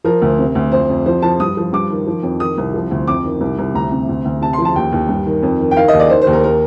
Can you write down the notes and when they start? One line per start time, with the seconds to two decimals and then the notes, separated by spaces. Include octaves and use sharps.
0.04 F3 A#4
0.22 D2
0.39 C3
0.55 D2
0.72 F2 C5
0.89 F2
1.06 F3 C5
1.22 F3 A5
1.40 G2 D#6
1.57 F3
1.73 G2 D6
1.90 D#3
2.07 F3
2.23 F2
2.40 D#3 D#6
2.58 C2
2.74 F3
2.91 D2
3.08 F2 D6
3.24 D#3
3.41 C2
3.59 C2
3.74 D2 A#5
3.92 C3
4.09 D2
4.25 D2
4.42 C3 A5
4.53 C6
4.58 F3
4.65 A5
4.75 D#2 G5
4.92 D#2
5.09 G2
5.26 D#3
5.43 F2
5.60 D#3
5.71 G5
5.76 D#3 F5
5.88 D#5
5.93 D#2
6.00 D5
6.10 D#3 C5
6.22 C5
6.27 D#2
6.33 A#4
6.44 A#4